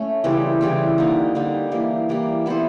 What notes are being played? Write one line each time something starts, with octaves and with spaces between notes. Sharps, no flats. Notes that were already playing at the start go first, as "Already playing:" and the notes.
Already playing: A3 C#4
C#3 E3 G3 C4
C#3 E3 G3 C4
D3 G3 A#3 D#4
D3 G3 A#3 D#4
E3 G3 A#3
E3 G3 A#3
B3 E4 A4 C5